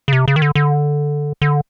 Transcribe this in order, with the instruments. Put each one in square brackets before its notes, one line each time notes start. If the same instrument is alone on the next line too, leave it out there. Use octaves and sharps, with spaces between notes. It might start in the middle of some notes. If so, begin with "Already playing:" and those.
[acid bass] C#3
C3
C#3
D#3
D3
D3
D3